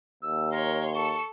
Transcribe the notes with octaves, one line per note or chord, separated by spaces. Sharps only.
D#2 E6
A#4 C#5 C6
A4 C#6